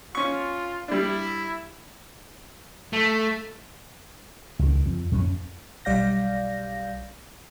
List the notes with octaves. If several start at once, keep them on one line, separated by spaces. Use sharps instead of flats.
C#4 F4 C#6
G3 D4 E4
A3
C#2 D#3
F2
F2 B3 C#4
B1 G3 D5 F5 G6 A#6